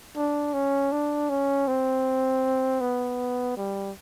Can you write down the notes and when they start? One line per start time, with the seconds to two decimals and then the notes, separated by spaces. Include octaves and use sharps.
0.16 D4
0.54 C#4
0.92 D4
1.30 C#4
1.67 C4
2.81 B3
3.57 G3